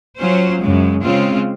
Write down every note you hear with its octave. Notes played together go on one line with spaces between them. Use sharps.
F#3 C#4 F4 C5
F#2 C#3 G#3
C#3 G#3 C4 F4